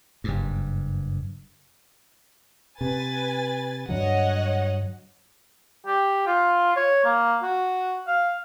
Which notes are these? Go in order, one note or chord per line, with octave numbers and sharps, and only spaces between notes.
F#1 G2
C3 B4 G#5 A6
G2 D3 F#3 C#5 D#5 F#5
G4
F4
C#5
A#3
F#4
F5